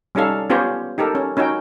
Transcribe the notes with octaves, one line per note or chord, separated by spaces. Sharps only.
G3 C#4 D#4 A4 F5
B3 C#4 F4 G4 C5 C#5
D#4 G4 A4 A#4
C#4
C#4 D#4 F#4 G5